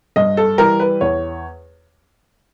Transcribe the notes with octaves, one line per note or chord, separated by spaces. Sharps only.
G2 D#5
A4
E3 G3 A#4
B4
E2 C#5